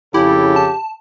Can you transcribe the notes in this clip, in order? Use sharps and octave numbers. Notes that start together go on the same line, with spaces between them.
F2 C#3 E4 G4 A4
A5